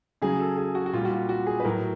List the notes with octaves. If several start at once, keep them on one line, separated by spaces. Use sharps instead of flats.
C#3 F#3 G#4
A4
G#4
F#4
F#4
A#2 G3 F4
F#4
F4
F#4
G#4
B4
A2 F#3 A#4